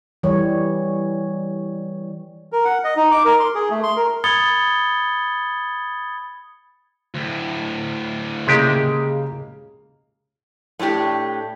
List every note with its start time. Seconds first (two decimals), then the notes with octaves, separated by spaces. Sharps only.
0.23 E3 G3 C#5
2.52 A#4
2.65 F#5
2.84 D#5
2.96 D#4
3.11 D6
3.25 A#4
3.40 C6
3.55 G#4
3.71 A3
3.83 C6
3.96 A#4
4.24 B5 D#6 G#6 A6 C#7 G7
7.14 D2 A2
8.47 C#3 G#3 A#3 G4 G#4 D#5
10.79 A2 A3 D4 G4